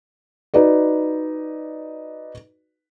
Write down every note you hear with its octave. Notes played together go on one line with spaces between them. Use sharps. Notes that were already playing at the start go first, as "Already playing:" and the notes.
D#4 F#4 B4 D5